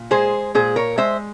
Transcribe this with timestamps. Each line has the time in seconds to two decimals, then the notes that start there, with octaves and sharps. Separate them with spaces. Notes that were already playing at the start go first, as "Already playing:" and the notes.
Already playing: A#2
0.11 G#3 G#4 C5
0.55 A#2 G#4 C5
0.76 A#4 C#5
0.97 G#3 C5 E5